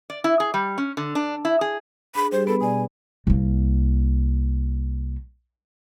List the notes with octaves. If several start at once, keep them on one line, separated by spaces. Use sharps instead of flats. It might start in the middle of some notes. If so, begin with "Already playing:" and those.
D5
E4
G#4
G3
C#4
D3
D4
E4
G#4
D4 G#4 B5
G3 G4 G#4 C5
B3 A4 B4 B5
B2 D5 G#5
C2 A#3